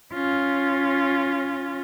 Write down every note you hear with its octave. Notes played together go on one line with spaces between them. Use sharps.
C#4 F4